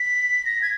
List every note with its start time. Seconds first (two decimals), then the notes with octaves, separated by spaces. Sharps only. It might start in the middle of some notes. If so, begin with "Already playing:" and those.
Already playing: B6
0.45 A#6
0.62 G#6